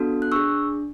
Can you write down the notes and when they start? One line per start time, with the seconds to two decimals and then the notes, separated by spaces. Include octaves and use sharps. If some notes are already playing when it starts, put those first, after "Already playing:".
Already playing: B3 D4 F#4 A4
0.22 F#6
0.32 D4 G#4 C#6 E6